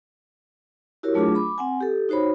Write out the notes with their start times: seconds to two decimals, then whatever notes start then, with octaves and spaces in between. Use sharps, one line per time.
1.03 E4 F#4 G4 A#4 C#5
1.14 F#3 A3 D4 F4 G#4 D6
1.35 B5 D6
1.58 C4 F#5 G#5
1.80 G4 A4
2.09 D#4 F#4 C5 C#5 B5